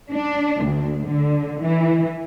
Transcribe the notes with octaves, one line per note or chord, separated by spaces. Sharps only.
D4
D2
D3
E3